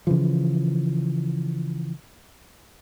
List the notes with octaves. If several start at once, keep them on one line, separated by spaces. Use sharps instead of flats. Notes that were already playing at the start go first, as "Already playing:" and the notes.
C#3 E3 F3